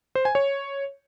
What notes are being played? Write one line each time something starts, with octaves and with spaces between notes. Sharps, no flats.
C5
G#5
C#5